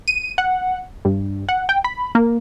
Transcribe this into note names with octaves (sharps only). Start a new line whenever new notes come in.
D#7
F#5
G2
F#5
G5
B5
A#3